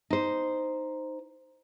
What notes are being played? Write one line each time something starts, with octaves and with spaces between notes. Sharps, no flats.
D#4 C5